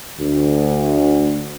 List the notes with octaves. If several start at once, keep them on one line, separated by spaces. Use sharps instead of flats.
D2